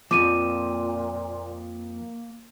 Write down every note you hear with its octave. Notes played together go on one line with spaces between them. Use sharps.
F2 A#2 F3 A#3 D6 D#7